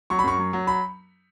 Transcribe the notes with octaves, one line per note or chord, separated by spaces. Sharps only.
F#3 C#6
B5
F#2 C#6
F#3
F#3
B5